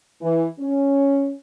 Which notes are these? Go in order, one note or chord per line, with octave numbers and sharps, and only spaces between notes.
E3
C#4